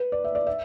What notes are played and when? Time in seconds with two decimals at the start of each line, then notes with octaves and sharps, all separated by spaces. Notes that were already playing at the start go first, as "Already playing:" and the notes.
Already playing: B4
0.12 D5
0.24 E5
0.35 D5
0.47 E5